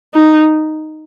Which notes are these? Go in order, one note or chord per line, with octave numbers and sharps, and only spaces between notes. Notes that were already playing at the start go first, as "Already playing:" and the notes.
D#4